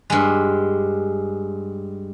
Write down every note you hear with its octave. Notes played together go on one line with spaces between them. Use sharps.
G2 G#3